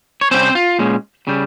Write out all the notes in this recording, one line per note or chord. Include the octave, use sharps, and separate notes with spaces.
C#5
C3 G3 C4 C#4 C5
F4
A#2 G#3 C#4
C#3 G3